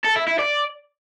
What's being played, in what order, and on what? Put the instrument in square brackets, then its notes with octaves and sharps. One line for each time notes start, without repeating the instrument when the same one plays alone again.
[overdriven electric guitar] A4
E4
E4
D5